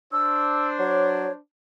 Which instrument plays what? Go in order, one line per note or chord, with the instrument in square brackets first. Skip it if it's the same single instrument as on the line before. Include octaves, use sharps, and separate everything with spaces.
[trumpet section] D4 C5 [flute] E6
[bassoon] F#3 [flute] C#5